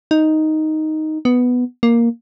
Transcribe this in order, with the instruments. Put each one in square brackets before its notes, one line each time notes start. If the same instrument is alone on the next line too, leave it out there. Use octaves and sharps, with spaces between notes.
[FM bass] D#4
B3
A#3